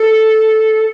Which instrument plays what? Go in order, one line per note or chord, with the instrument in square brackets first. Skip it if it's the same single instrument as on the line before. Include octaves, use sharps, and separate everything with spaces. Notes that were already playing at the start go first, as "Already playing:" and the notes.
Already playing: [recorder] A4